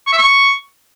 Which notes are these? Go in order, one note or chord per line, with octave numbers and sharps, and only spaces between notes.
C#6
E5
C#6